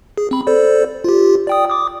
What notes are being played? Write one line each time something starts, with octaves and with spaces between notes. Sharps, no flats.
G#4
C4 B5
A4 C5 D5
F4 G4
D5 G5 D#6
D6 D#6